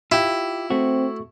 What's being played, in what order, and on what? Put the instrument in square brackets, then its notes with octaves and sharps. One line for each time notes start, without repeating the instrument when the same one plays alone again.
[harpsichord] E4 [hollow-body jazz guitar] F4 G4
[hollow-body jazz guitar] A3 F#4 [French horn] C4